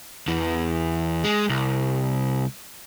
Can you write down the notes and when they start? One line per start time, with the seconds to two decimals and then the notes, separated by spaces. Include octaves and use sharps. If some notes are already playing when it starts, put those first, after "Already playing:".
0.27 E2 E3
1.24 G#3
1.49 C2